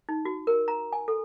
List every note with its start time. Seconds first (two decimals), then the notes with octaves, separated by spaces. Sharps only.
0.09 D#4
0.25 F#4
0.47 A#4
0.68 A#5
0.93 G#5
1.08 A4